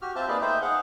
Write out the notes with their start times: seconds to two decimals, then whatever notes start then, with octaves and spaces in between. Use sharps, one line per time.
0.02 F#4 G4 F6
0.16 C4 F4 C5 E5 F5 A5
0.28 A#3 D#4 G#4 B4 D5 F5
0.41 A3 D#4 C5 E5 G5
0.62 G#4 F5 F#5